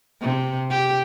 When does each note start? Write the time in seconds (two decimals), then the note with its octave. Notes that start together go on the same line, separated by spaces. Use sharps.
0.22 C3
0.70 G4